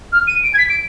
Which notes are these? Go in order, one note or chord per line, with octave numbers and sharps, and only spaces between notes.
F6
D#7
D7
G#6
B6
D7